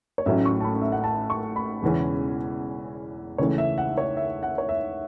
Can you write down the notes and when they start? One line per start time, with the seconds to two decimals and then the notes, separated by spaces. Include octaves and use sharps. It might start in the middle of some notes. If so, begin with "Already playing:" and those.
0.18 C#5
0.26 A1 A2 F#3 C#4 E5
0.45 C#6
0.60 A5
0.64 B5
0.82 E5
0.92 F#5
1.04 A5
1.30 C#6
1.56 B5
1.82 E1 E2 C#3 E3 C#4
3.38 C#2 C#3 E3 A3 C#5
3.58 E5
3.78 F#5
3.98 C#5
4.17 E5
4.43 F#5
4.58 C#5
4.69 E5